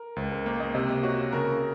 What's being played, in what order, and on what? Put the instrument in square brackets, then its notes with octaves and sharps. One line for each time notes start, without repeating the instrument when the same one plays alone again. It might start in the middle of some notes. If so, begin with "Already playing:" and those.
Already playing: [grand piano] A#4
[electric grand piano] C#2 [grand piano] C5
[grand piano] A#4
[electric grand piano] A#3 [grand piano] C5
[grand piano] D#5
[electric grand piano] C3 [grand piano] D#5
[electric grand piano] F#4 [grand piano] C#5
[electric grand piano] C#3 [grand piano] A#4